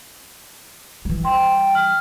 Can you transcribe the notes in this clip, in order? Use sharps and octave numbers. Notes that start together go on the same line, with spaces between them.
E3 G3
G5 C6
F6